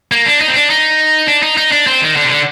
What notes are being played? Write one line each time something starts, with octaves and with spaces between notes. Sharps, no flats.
A#3
D4
D#4
C4
D4
D#4
D4
D#4
D#4
D4
C4
D#3
D3
C3
D3